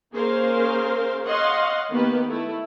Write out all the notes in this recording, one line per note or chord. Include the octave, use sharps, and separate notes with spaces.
A#3 C#4 G#4 A#4 C5 F5
C#5 D#5 F5 F#5 C6
D#3 A#3 B3 G4 B4
A3 E4